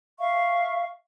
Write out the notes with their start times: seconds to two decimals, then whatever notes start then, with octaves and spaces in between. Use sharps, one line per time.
0.19 E5 F5 C#6